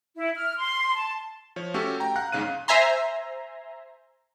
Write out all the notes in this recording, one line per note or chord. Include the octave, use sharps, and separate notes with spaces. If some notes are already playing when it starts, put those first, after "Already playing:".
E4
F6
C6
A5
F3 C#5
A3 C#4 F#4 G4 A4
G5 A#5
F5 F#5 A#5 F#6
B1 G#2 C#3 F5 F#6 D#7
C5 E5 G#5 A#5 C6